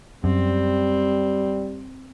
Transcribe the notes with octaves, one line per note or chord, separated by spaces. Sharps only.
F#2 G3 C4